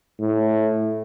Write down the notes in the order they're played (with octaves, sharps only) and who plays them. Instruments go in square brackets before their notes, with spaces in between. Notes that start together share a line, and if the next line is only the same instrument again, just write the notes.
[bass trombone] A2